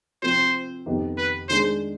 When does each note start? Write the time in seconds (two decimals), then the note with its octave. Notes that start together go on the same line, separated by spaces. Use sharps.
0.22 F3 C4 F4 C5
0.86 F2 D#3 B3 D#4 G4
1.18 B4
1.49 D#3 G#3 D4 G#4 C5